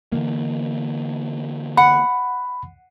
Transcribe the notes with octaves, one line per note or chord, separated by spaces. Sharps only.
D3 E3 A#3
F#5 B5